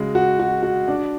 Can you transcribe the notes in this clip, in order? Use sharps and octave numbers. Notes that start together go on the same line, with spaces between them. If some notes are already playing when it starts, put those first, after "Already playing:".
Already playing: C#3 G#3 F#4
F#4
F#4
F#4
D4